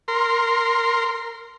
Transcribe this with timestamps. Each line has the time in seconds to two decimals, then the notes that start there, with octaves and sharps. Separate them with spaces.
0.08 A#4 C6